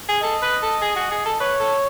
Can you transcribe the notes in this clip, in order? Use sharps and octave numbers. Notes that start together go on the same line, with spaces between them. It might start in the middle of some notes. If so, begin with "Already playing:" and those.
G#4
A4 D#5
B4
A4
G#4
F#4
G#4
A4
B4 C#5
A4